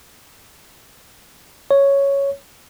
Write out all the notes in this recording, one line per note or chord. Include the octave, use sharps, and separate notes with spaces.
C#5